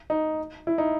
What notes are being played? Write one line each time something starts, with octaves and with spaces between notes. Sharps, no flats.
D#4
E4
D#4